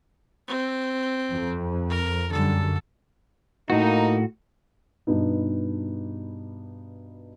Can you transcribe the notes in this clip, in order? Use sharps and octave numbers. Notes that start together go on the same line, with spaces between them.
C4
F2
A#4
F#2 D3 G3 A4
A2 A#3 D#4 F#4
G2 B2 B3 D#4